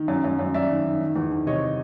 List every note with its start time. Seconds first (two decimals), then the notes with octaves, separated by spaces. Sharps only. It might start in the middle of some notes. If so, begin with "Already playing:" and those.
Already playing: D#3
0.08 F#2
0.24 F#2
0.39 F#2
0.54 F#2 D5 E5
0.70 D#3
0.85 D#3
1.01 D#3
1.16 E2
1.31 D#3
1.46 C3 C#5 D#5